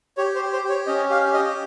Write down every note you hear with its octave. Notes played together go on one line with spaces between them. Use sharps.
G4 C#5
C5
G4
C5
G4
C#5
C#4 D#5
G4 F5
G4 D#5